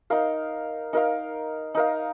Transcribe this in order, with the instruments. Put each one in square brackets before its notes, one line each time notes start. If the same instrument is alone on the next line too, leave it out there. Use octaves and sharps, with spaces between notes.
[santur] D#4 A#4 F5
D#4 A#4 F5
D#4 A#4 F5